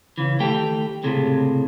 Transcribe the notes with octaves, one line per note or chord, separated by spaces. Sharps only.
C#3 E3
D#3 A3 G4 G5
C#2 A2 C3 G#3